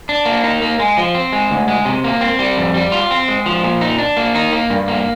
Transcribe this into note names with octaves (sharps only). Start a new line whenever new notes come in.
D4
A#3
D#4
A#3
G#3
F3
C4
G#3
D2
G#3
C3
A#3
C4
G3
F2
G3
F4
C4
G#3
F3
A#2
D#4
D4
A#3
D#4
A#3
G2
A#3